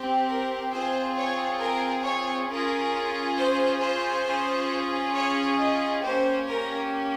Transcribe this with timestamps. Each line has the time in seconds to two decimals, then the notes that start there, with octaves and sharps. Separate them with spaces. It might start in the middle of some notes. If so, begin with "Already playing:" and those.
Already playing: C4 G4
0.28 A#4
0.72 C4 F4 G#4 C5
1.16 C#5
1.61 A#4
2.04 C#5
2.48 C#4 F4 G#4 A#4
3.38 C5
3.81 C5
4.25 C#4 F4 G#4
5.14 C#5
5.58 D#5
6.02 A#3 C#4 G4 C5
6.47 A#4